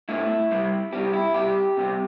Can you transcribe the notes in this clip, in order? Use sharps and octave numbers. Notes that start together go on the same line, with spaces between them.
A2 A3 C4 E4
C3 G3 C4
C3 G3 C4 G4
E4
C3 G3 C4 G4
C3 G3 C4